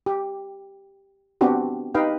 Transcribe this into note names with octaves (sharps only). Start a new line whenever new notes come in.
G4
B3 C4 D4 F#4 G4
D#4 G4 B4 D#5 F5 G5